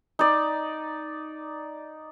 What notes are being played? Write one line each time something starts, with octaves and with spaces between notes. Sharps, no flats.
D#4 D5